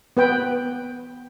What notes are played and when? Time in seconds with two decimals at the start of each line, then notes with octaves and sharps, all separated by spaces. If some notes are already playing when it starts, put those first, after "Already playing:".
0.17 B3 B4 G5